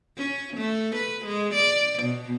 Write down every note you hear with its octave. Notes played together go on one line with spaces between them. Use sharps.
C#4
A3
B4
G#3
D5
B2